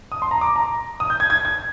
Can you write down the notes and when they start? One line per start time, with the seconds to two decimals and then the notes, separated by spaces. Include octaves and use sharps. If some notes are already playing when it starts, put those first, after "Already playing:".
0.12 D#6
0.22 C6
0.31 A#5
0.41 D6
0.56 A#5
1.00 D#6
1.10 G6
1.20 G#6
1.30 G#6
1.45 G#6